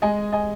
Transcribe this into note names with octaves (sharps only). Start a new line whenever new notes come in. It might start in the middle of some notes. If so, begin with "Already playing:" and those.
G#3 D#5 G#5
D#5 G#5